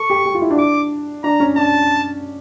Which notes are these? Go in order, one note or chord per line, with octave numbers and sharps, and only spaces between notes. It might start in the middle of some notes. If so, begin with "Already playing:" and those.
Already playing: A4 C#6
G4
G4
F4
E4
D4
D6
D4 A#5
C#4
D4 A5